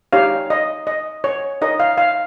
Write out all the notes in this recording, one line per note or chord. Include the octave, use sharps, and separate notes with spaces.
D#4 G4 C#5 F5
D#5
D#5
C#5
D#4 A#4 C#5 D#5
F5
F5